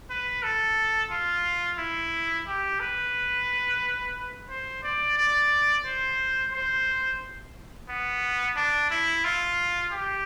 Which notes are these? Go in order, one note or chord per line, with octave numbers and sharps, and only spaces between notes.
B4
A4
F4
E4
G4
B4
C5
D5
D5
C5
C5
B3
D4
E4
F4
G4